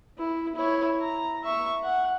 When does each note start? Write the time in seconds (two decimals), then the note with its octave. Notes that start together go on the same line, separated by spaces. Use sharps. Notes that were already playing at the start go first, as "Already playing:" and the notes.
0.18 E4
0.55 E4 C#5
1.02 A#5
1.43 E5 C#6
1.84 F#5